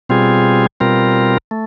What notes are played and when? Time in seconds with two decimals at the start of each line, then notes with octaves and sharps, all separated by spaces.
0.09 B2 G3 C4 F4 G#4
0.80 B2 G3 C4 F4 A#4
1.51 A3